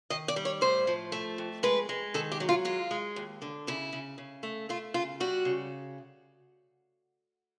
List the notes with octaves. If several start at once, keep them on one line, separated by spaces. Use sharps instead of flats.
D#3 D#5
D5
G3
C#5
A2 C5
F3
A3
F2
G#3 B4
G#3
D#3 A4
G4
F#3
F4
G#3 F4
G#3
D#2
D3
C#3 E4
C#3
C#3
A3
A3 F4
C#3 F4
G3 F#4
C#3